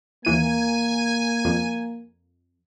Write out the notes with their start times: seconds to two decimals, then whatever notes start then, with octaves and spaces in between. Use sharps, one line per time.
0.25 D#2 E3 A#3 G#5 D#7
1.45 F2